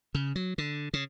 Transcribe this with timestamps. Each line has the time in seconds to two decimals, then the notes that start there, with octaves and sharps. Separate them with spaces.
0.15 C#3
0.36 F#3
0.58 D3
0.94 C#3